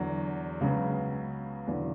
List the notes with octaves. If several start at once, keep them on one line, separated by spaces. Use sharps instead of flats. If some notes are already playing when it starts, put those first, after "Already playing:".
Already playing: E2 D3 F#3
C#2 C#3 F#3 B3
E1 E2 D3 F#3